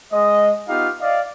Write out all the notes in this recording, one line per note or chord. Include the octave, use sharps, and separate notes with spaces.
G#3 D#5
B3 D#4 F4 G4 F5
D5 D#5 F5